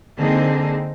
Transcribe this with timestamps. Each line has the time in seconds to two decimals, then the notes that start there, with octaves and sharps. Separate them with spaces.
0.18 D3 A#3 C4 D#4 G#4